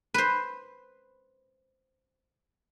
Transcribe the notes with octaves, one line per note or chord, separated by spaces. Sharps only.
B4 C5